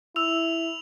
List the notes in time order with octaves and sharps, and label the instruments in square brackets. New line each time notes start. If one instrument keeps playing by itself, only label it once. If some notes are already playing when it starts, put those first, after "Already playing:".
[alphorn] E4 [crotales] E6 F7